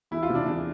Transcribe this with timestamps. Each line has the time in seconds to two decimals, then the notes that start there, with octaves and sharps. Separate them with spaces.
0.11 E2 E4
0.23 F4
0.29 C3
0.35 D4
0.46 E2 D4